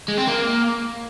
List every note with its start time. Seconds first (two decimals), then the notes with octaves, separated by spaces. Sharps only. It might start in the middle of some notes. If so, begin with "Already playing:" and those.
0.08 G#3
0.18 C4
0.27 A#3